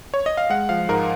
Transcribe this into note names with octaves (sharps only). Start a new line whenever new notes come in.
C#5
D#5
F5
G#3 F#5
F3 F5
G#2 A#4